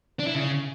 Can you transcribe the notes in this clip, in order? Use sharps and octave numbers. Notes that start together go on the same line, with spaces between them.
D4
E4
C#3